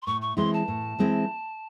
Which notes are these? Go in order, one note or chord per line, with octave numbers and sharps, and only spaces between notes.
C6
A2 C#6
C#6
E3 G#3 C4 E4 C6
A5
A2
E3 G#3 C4 E4